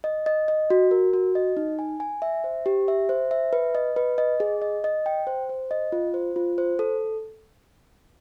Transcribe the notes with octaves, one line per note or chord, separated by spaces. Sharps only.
D#5
D#5
D#5
F#4
A#4
F#4
D#5
D#4
G#5
G#5
E5
C5
G4
E5
C5
E5
B4
D#5
B4
D#5
G#4
D#5
D#5
G5
C5
C5
D#5
F4
C5
F4
C5
A4